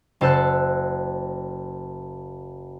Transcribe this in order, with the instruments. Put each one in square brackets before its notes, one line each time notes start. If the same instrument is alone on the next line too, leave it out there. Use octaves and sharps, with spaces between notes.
[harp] F#1 A4 C5 A5 F#6